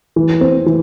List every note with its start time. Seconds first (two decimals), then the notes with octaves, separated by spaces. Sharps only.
0.16 E3
0.41 C4
0.66 E3